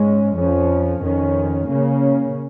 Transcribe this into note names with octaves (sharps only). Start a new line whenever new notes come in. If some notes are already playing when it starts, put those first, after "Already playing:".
Already playing: G#2 G#3 C#4
F2 F3 C#4
F2 D#3 C#4
C#3 A#3 C#4